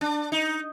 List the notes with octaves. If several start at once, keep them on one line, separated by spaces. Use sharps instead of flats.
D4
D#4